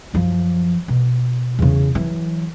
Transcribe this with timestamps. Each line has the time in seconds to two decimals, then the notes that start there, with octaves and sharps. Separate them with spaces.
0.14 F#2 F3
0.88 B2
1.59 E2 C#3
1.95 E3 F#3